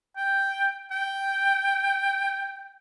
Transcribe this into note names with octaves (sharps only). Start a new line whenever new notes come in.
G5
G5